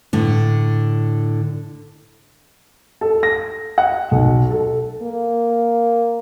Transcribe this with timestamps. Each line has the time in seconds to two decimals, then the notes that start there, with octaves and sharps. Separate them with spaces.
0.13 A2 D3
3.01 A4
3.23 A#6
3.78 F#5
4.11 B1
4.51 A4
5.02 A#3